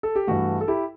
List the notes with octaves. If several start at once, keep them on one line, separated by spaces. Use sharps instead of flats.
A4
G4
G2 E3 A3 F#4
A4
E4 G4